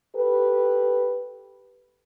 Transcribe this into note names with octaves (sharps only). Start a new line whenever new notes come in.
G4 A4 B4